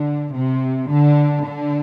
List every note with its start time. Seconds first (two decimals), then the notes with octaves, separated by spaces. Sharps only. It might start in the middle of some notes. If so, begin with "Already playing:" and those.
Already playing: D3
0.35 C3
0.89 D3
1.44 D3